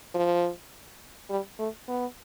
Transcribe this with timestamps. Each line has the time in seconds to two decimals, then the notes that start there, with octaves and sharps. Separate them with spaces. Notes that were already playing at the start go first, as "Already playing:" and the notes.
0.15 F3
1.30 G3
1.59 A3
1.88 B3